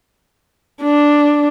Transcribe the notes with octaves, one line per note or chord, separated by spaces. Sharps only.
D4